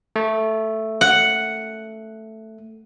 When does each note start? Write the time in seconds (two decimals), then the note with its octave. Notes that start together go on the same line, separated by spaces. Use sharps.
0.16 A3
1.01 F#5